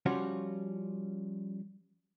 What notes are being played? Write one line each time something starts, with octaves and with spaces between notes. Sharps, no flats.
F3 G3 C#4 F4 F#4 C#5